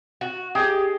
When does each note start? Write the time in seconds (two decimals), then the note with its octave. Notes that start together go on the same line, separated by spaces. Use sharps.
0.21 F#4
0.55 G4 G#4 D#5